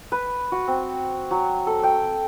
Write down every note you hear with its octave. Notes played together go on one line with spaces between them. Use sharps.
B4
F#4
C4
F#3
A4
G5